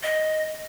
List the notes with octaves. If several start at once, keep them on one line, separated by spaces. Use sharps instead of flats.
D#5